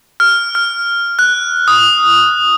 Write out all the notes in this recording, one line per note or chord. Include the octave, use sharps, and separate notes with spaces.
F6
F6
F#6
D#6